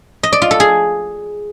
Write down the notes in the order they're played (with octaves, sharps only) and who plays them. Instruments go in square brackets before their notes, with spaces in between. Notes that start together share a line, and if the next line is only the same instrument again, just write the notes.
[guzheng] D#5
D5
F4
A4
G#4